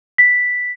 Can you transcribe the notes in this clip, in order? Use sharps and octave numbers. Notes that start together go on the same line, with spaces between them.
B6